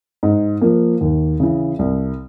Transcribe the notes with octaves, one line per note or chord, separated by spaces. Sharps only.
G#2
F3 A#3
D#2
C#3 E3
C2